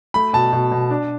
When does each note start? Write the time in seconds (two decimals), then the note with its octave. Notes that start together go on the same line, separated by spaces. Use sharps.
0.14 A3 B5
0.33 B2 A5
0.53 B2
0.71 B2
0.90 D4